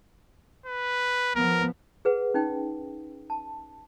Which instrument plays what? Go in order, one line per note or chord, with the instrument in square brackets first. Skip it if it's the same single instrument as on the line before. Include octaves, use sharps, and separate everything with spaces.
[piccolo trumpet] B4
[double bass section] F3 B3 [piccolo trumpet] A#4
[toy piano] G#4 B4 F#5
C#4 D#4 G5
A5